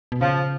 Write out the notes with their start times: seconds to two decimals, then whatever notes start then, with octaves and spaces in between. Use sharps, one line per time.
0.12 B2
0.21 C#3 F3